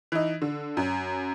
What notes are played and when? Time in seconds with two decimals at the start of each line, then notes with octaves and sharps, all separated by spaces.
0.12 E3 D#4
0.42 D3
0.77 F#2